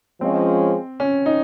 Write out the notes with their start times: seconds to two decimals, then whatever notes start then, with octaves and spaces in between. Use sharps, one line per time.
0.21 F3 G#3 C4 C#4
1.00 C#4
1.26 D#4